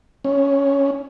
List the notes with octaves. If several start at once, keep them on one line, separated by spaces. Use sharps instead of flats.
C#4